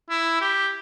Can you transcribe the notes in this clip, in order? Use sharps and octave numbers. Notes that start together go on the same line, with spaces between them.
E4
G4